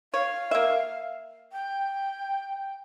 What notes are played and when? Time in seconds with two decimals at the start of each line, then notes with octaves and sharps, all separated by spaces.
0.14 C#5 F5
0.51 A#3 E5
1.52 G5